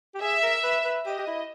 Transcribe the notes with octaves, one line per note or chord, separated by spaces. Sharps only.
G4
G#4 E5
A#4
B4
B4
G4 D#5
G4
E4